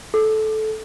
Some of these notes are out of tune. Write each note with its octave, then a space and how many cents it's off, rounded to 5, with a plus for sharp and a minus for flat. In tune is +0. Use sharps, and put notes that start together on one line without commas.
A4 -15